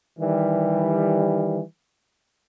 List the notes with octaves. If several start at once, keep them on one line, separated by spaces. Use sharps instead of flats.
D#3 E3 G3